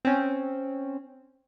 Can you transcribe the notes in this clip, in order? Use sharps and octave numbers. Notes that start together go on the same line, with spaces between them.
C4 C#4